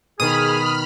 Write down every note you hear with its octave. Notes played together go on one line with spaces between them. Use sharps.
B2 D#3 G#4 B5 D#6 F6